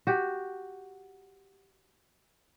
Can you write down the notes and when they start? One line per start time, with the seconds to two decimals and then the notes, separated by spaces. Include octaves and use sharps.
0.07 F#4 G4